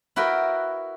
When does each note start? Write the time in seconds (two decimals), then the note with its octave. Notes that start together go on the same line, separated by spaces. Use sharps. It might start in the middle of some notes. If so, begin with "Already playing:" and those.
0.16 E4 F#4 A#4 B4 G5